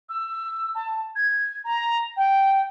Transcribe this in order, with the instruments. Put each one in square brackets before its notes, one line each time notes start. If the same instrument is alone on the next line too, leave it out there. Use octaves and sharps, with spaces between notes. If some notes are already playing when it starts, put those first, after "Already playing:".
[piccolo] E6
A5
G#6
A#5
G5